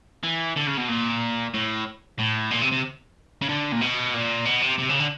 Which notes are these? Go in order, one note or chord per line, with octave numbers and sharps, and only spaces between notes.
E3
D3
C#3
B2
A#2
A2
A2
A#2
C3
C3
C#3
D3
A#2
B2
A#2
B2
C3
C3
C#3
D3